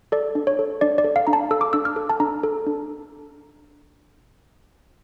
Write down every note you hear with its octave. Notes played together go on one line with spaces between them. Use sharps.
A4 D5
D4
C#5
A4
D4 D5
D5
A4
F5
D4 A#5
A5
A4 E6
D6
D4 E6
F6
A4
A5
D4 A#5
A4
D4